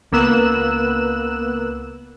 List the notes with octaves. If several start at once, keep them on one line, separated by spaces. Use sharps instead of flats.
C#2 A#3 B3 E6 F#6 E7